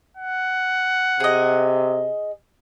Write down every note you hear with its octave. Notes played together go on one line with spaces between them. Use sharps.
F#5
C3 G#4 D#5